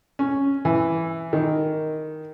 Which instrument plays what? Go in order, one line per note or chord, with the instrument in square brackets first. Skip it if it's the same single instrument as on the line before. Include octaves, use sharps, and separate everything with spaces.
[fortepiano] C#4
E3
D#3